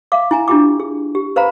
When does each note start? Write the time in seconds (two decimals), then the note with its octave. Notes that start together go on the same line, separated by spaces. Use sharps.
0.12 E5 F5 D6
0.31 E4 G#5 A#5
0.48 D4 E4 F4 G4 G5 D6
0.80 G#4
1.15 G4
1.36 B4 C5 F5 A#5 B5